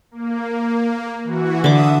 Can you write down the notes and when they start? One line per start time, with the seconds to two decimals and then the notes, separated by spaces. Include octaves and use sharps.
0.11 A#3
1.24 E3 F#4
1.64 D3 E5 D6 D#6